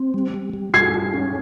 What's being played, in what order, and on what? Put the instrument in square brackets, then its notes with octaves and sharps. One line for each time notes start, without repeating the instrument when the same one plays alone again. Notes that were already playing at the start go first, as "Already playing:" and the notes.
Already playing: [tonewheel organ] C4
G3
G3
G3
[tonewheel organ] G3 [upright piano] G#6 C7
[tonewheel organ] G3
C#4